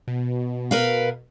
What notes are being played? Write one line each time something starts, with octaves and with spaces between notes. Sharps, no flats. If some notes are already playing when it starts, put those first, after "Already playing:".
B2
A#4 B4 F5